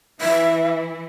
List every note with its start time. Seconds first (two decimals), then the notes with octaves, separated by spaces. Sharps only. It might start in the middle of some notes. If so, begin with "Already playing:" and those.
0.21 E3 E4 E5